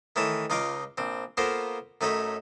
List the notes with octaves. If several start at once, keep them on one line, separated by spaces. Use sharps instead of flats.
D#3 E3 A3 C#5 A5
C#2 D#4 F4 F5 C#6 D6
A#1 C4
A#3 B3 F4 A4 A#4 C5
F#2 A3 D#4 A4 C#5 B5